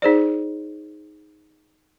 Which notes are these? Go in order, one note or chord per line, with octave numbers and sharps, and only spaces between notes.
D#4 G#4 C5 D5